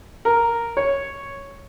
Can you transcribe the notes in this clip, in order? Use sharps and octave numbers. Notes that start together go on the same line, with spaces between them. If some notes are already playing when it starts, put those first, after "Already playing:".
A#4
C#5